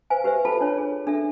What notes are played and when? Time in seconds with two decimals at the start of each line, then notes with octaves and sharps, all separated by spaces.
0.10 B4 C5 F5 G#5
0.24 G4 B4 C5 E5
0.45 F4 A4 A5 B5
0.61 D4 C#5
0.78 G#4
1.07 D4 A4 E5